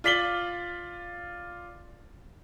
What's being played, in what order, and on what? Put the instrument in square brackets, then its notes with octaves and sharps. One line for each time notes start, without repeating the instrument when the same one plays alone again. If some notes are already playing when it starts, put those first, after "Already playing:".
[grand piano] F4 D5 B6 F#7 G7